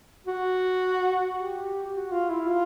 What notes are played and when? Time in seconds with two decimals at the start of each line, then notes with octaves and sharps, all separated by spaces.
0.27 F#4
1.37 G4
1.92 F#4
2.12 F4
2.30 E4
2.48 F4